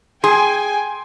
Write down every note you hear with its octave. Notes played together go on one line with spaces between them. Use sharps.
G#4 G5 G#5 C6